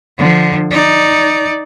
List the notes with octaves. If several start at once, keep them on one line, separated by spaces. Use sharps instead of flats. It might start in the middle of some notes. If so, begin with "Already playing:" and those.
D3 F3
D#4 D5